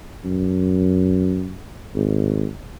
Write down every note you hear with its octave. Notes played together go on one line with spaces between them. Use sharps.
F#2
G#1